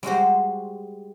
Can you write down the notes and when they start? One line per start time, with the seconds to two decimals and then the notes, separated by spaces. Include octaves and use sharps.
0.03 G3 G#3 F#4 C5